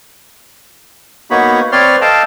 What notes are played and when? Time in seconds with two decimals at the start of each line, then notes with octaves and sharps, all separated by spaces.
1.31 A#3 B3 D#4 F#4 C#5 B5
1.72 C4 B4 C#5 D5 C6 F6
2.01 A4 D#5 F5 G5 A5